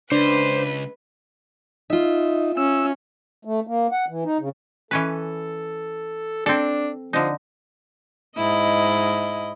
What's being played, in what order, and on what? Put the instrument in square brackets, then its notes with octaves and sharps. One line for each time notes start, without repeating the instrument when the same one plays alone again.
[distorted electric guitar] C#2 [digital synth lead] D4 [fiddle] B4 [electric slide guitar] C5
[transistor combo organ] D#4 [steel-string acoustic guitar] F4 E5
[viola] C#4 [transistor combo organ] E6
[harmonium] A3
A#3
F#5
E3
D#4
C#3
[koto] E3 C#4 B4 [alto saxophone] A4
[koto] C4 A4 [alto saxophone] D4
[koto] D3 D#4 [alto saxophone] F3
[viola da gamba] G#2 E4 D#5